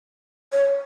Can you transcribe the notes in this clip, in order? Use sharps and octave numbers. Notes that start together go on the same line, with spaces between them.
C#5